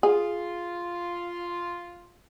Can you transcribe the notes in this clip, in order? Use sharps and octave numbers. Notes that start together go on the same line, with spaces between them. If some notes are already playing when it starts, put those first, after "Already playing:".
F4 G#4